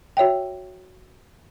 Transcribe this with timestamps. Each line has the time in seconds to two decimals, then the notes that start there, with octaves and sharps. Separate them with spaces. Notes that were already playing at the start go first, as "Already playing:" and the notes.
0.17 F#4 C#5 E5 G5